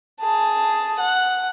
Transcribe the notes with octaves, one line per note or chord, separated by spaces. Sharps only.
G#4 A5
F#5